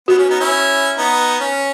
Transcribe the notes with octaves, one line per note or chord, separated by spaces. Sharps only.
B3 F#4
C#4
B3 D#4
C#4 E4
B3 D#4
C#4